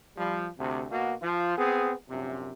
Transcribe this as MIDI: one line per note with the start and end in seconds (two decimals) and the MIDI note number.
0.18 0.48 53
0.18 0.48 55
0.59 0.85 38
0.59 0.85 48
0.90 1.14 47
0.90 1.14 58
0.90 1.14 66
1.22 1.58 53
1.22 1.58 65
1.58 1.94 59
1.58 1.94 60
1.58 1.94 68
2.09 2.52 34
2.09 2.52 42
2.09 2.52 48